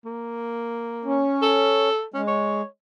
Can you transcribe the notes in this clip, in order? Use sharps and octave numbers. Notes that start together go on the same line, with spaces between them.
A#3
C#4
A4
G#3 C#4
C#5